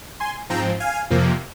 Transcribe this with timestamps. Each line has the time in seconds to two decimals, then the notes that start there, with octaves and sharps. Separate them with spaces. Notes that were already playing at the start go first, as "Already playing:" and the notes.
0.20 G#5 C6
0.50 G#2 F3 C4 G5 A#5
0.80 F5 G#5
1.10 F2 C3 F3 A#3